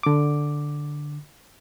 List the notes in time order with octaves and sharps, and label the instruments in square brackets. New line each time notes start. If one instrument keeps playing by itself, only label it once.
[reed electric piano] D3 D6